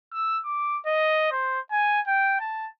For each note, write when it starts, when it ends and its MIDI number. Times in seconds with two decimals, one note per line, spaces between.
0.13 0.38 88
0.45 0.78 86
0.86 1.31 75
1.32 1.60 72
1.72 2.01 80
2.08 2.39 79
2.40 2.68 81